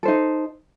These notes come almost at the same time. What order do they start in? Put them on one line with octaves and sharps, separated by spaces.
A4 C5 D#4